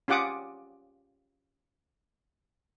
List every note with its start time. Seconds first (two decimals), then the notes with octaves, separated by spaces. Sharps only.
0.08 C#4 F4 G4 F#5 D6 D#6